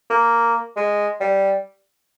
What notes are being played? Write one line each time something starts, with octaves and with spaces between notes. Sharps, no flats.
A#3
G#3
G3